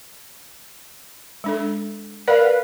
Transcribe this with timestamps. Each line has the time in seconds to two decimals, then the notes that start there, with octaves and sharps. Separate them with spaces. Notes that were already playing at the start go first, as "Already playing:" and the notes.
1.44 G#3 D4 A4
2.28 A#4 B4 D5 F5 F#5